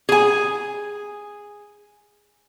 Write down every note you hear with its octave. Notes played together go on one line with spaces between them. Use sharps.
G#4 G#5